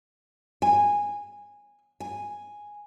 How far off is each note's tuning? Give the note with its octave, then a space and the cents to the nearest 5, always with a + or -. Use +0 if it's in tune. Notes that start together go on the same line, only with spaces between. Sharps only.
G#5 -15
G#5 -5